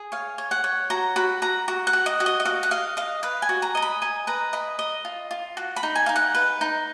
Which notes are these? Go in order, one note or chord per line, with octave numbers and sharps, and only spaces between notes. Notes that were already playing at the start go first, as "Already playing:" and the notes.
Already playing: G#4
C#5 F5
C#5
F#5
C#5
F#4 A#5
F#4 B5
F#4 A#5
F#4
F#5
F#4
D#5
F#4
D#5
D#5
F#4 F5
F#5
D#5 F5
D#5 F5
B4 F5
G#5
F#4
A#5
D#5 A#5
B5
D#5 G#5
B4 A#5
D#5 B5
D#5
F4
F4
F#4
B5
D#4
G#5
D#4 F5
F#5
B4
D#4